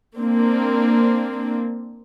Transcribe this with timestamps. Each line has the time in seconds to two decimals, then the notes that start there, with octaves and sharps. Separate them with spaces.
0.18 A#3 C4 D4